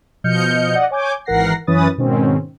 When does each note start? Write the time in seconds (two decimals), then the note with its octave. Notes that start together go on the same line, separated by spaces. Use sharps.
0.24 B2 F3 D#5 F6 G6 C#7
0.75 D5 D#5 F#5
0.91 C#5 G#5 D6 G6 G#6
1.25 G#1 E3 A#4 F#5 A#6 C7
1.67 F#2 E3 C#4 B4 D#6 A6
1.97 G#2 B2 D#3 C4 C#4